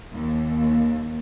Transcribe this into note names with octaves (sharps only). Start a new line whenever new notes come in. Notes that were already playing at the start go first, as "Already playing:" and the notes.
D#2